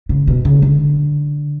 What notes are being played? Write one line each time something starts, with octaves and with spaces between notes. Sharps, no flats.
C#3
B2
C#3
D3